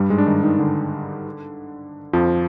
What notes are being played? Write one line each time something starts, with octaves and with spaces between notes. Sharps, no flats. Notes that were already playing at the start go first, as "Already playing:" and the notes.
Already playing: G2 G3
G#2 G#3
D4
D#3 D#4
D#3 D#4
D3 D4
F2 F3